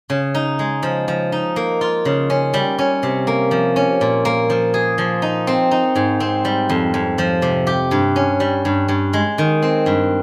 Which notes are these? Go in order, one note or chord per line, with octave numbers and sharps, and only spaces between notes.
C#3
D#4
G#3
F3
F3
D#4
A#3
F4
C#3
C#4
G3
C#4
C3
A#3
F3
C#4
A#2
A#3
F3
G#4
F3
D#4
C4
D#4
G#2
C4
G3
F2
F2
F3
C3
G4
G2
C#4
G3
G2
G2
G#3
D#3
C4
G2